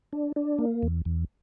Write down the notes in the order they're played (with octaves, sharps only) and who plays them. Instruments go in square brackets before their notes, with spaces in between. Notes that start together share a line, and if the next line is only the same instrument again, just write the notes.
[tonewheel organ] D4
D4
A#3
E2
E2